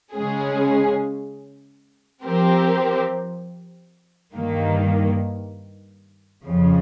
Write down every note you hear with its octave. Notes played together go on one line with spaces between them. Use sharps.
C#3 G#3 C#4 G#4
F3 C4 G4 A#4
G2 D#3 A#3
F2 C#3 F3